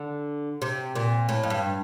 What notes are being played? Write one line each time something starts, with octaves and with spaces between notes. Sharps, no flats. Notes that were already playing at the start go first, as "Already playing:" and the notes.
Already playing: D3
C3
A#2
A2
F2
G2